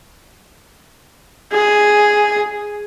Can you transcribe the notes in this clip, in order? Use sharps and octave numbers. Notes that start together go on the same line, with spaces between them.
G#4